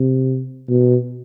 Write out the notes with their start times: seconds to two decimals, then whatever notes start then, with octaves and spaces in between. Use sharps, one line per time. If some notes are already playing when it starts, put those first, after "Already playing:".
Already playing: C3
0.69 B2